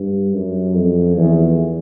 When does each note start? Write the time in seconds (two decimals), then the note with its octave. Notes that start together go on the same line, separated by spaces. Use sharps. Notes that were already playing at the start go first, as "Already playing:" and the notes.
Already playing: G2
0.34 F#2
0.75 F2
1.17 E2